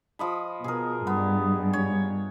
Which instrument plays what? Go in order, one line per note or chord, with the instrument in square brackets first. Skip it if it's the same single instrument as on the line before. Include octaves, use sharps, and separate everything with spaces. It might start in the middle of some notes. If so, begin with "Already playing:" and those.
[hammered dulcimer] F3 D#5 B5
[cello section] B2 [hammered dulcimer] G#4 A#4
[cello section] G2 G3 [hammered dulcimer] B3
[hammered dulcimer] C#5